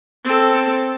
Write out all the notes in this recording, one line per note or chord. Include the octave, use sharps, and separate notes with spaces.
C4 A4